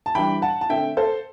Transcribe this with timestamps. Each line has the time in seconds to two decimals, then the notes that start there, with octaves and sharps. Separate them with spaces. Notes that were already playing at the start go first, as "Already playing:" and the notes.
0.06 A5
0.15 E3 G3 D4 G5 B5
0.42 F#5 A5
0.61 A5
0.70 D3 A3 C4 E5 G5
0.97 A4 C5